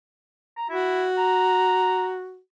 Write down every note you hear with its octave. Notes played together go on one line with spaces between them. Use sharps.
A#5
E4 F#4
A#5